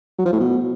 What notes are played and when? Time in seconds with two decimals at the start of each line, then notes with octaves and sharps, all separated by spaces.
0.18 F#3
0.26 F3
0.33 A2
0.40 B2